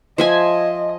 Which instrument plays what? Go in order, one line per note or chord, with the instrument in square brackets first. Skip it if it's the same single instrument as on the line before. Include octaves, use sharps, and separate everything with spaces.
[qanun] F3 E5 G#5 [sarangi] D#5